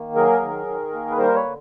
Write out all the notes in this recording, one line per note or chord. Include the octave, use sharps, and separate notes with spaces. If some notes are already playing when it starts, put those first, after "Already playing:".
Already playing: D#3 A#3
F#3 G#4 A#4
D#3
D#3
A#3
B4
G3 A#4 C5
B4 C#5
D3